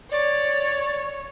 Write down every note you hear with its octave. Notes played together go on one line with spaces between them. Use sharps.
C#5 D5